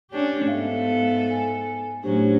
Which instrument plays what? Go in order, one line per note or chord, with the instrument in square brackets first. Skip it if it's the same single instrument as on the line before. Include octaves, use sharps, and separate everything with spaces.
[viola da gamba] C#4 D4 G4
[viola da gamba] G#2 B3 A4 [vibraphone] E5 F5
[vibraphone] G#5
[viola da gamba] A2 F#3 C#4 [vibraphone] D4 G4 C5